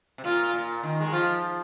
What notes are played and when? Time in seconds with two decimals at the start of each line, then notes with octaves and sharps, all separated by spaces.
0.18 C3
0.24 A#2 F4
0.54 A#2
0.83 D#3
1.00 G#3
1.13 F3 F4